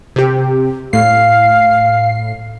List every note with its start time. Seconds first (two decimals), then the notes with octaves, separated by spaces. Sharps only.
0.16 C3 G4
0.93 A2 F5 C7